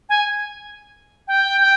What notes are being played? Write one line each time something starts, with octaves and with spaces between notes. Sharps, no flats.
G#5
G5
G5